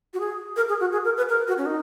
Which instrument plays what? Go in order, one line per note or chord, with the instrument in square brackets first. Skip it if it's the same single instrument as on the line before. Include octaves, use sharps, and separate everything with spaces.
[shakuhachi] F#4
G#4
A#4
G#4
F#4
G#4
A#4
B4
A#4
F#4
C#4
D#4